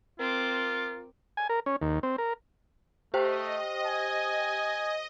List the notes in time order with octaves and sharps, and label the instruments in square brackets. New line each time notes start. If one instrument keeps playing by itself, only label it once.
[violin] C4 D6 [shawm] F4 [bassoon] A#4
[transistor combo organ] G#5
A#4
C#4
D#2
C4
A#4
[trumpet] A3 [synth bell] G4 C5 G5 [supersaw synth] D#5
[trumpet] G#5